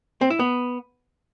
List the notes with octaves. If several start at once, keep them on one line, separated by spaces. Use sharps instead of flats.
C4
E4
B3